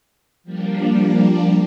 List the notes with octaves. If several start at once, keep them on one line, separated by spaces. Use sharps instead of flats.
F3 G3 A#3 D4